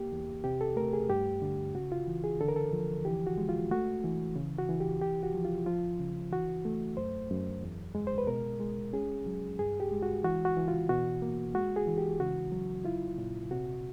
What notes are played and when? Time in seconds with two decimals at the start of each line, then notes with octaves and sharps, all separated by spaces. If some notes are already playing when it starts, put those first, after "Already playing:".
Already playing: A#3 G4
0.12 E2
0.44 C3 G4
0.61 A4
0.76 A3 A#4
0.93 G#4
1.09 G2 G4
1.42 D3
1.75 C#3 F#4
1.92 F4
2.08 E3
2.24 G#4
2.41 D3 A4
2.48 A#4
2.56 A4
2.73 F3
3.05 E3 G4
3.27 F#4
3.38 G#3
3.49 F4
3.71 A3 F#4
4.04 E3
4.35 C#3
4.58 F#4
4.69 E3
4.80 G4
5.01 C2 G4
5.23 F#4
5.34 F3
5.45 F4
5.66 F3 F4
5.99 C#3
6.32 E3 F#4
6.65 A3
6.97 F#2 C5
7.31 F#2
7.63 E2
7.95 G#3
8.07 C5
8.18 B4
8.27 B2 A#4
8.60 G#3
8.93 C#4 G#4
9.26 F#3
9.59 G2 G#4
9.80 G4
9.92 G#3
10.03 F#4
10.24 E3 F#4
10.45 F#4
10.57 E3
10.68 F4
10.89 B2 F#4
11.22 A#3
11.54 G#3 F#4
11.76 G#4
11.87 E3
11.98 G4
12.20 C#3 F#4
12.52 F#3
12.85 E4 F4
13.18 A#2
13.51 C3 F#4